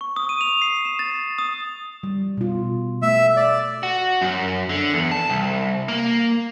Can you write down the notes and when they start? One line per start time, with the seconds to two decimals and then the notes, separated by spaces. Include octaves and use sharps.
0.01 C#6
0.16 D#6
0.29 D#7
0.41 F7
0.62 C7
0.85 E7
0.99 A6
1.38 D#6
2.03 G3
2.37 B2 F4
3.02 A3 E5
3.37 D5
3.83 F#4
4.21 F#2
4.69 D3
4.93 E2
5.11 A5
5.29 C2
5.88 A#3